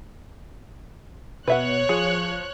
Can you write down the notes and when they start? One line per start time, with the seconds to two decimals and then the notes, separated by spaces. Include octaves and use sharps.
1.47 B2 B4 C#5 E5 F#5 F#6
1.89 F3 G#4